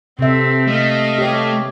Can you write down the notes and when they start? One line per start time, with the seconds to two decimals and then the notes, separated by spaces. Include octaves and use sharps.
0.19 C3 C4 A4 E5
0.68 A3 D#5 F5
1.18 G4 C#5